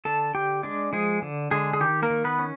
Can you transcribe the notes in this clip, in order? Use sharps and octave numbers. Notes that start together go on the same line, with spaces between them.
D3 A4 A5
D3 G4 G5
G#3 D4 D5
F3 G#3 G#4
D3
D3 G#3 G#4
G#4
D#3 G4
A#3 A#4
D#3
B3 B4
C#4